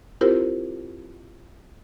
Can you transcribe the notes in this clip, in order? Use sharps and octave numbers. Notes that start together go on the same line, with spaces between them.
C4 E4 F4 G4 A#4 C5